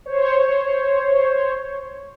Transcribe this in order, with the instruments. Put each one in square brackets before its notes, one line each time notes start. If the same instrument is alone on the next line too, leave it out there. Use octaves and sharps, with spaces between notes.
[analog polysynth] C5 C#5